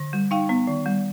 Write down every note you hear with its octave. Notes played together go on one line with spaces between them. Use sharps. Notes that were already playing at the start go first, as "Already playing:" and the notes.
Already playing: D3
G3
D#4 F5 G5
B3
D#3
G3